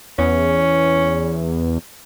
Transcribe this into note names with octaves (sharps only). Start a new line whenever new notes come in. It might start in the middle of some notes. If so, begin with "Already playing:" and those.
E2 C#4